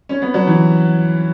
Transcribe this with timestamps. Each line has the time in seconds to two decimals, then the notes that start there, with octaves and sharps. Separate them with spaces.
0.09 C#4
0.22 B3
0.34 F#3
0.47 E3